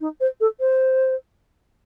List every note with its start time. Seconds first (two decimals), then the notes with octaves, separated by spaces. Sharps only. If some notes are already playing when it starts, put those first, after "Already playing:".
0.01 D#4
0.21 C5
0.41 A4
0.60 C5